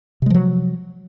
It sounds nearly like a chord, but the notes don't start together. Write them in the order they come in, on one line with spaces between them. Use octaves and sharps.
C3 G#3 F3 F#3